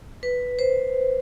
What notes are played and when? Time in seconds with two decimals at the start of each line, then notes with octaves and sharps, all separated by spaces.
0.23 B4
0.59 C5